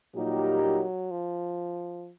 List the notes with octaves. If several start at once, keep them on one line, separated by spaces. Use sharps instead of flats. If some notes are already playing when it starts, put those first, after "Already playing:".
A#2 F#3 G3 A#3 D#4 G4
F#3
F3